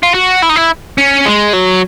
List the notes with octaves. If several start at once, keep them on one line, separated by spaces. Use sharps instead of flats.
F4
F#4
E4
D#4
E4
C#4
G#3
F#3